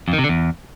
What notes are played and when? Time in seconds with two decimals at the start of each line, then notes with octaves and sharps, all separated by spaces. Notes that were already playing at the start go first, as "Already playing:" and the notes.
0.08 F2
0.13 D#3
0.18 C3
0.24 D3
0.29 E2